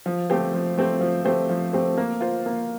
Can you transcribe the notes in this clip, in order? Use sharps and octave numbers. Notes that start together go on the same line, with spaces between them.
F3
A3 C4 G4 C5
F3
A3 C4 G4 C5
F3
A3 C4 G4 C5
F3
A3 C4 G4 C5
A#3
F4 C5
A#3